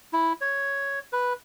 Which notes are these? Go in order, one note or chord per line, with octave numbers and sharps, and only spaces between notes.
E4
C#5
B4